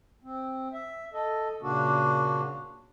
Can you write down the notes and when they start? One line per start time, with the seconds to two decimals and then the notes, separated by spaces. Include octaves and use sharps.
0.24 C4
0.72 E5
1.13 A4 D#5
1.62 A#2 C#3 A#3 D4 F#4